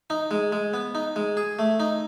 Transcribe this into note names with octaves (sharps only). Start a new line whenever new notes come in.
D#4
G#3
G#3
B3
D#4
G#3
G#4
A3
D#4